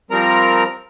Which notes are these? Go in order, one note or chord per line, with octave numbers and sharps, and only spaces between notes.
F3 G3 C4 A#4 A#5